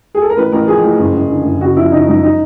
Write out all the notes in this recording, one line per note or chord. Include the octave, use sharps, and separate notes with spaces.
G#4
A4
A#4
A1 B4
A1 A#4
F3 G#4
A2
F#1
F#1
D3
F#1
C#3 F#4
F3 E4
C#3 D#4
F#2 D#4
D#4